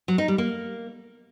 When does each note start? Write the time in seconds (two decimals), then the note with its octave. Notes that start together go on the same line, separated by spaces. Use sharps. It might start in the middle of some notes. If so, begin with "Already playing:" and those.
0.08 F#3
0.18 D#4
0.28 G3
0.38 A#3